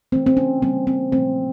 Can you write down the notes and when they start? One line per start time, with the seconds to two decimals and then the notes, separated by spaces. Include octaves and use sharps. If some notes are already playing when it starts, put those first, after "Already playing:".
0.12 E3 A3 C4
0.26 C4
0.37 C#4
0.62 C#3 E3 G3 A#3 C4
0.87 C4
1.12 A#2 F3 A3 C4